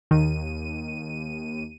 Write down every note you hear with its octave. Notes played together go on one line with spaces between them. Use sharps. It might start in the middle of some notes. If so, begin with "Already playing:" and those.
D#2 D#3 D#7